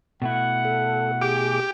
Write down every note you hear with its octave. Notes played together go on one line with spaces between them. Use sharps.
B2 A3 E4 F#5
A4
G4 G#4 D6